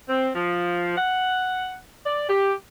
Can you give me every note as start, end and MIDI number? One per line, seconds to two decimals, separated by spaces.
0.09 0.30 60
0.35 0.94 53
0.97 1.75 78
2.06 2.26 74
2.29 2.53 67